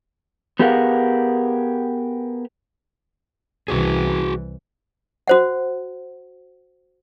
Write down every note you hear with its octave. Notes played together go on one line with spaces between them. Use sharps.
B3 G4 G#4 A#4 F5 F#5
C2 E3 F#4 G#4
F#4 C5 F#5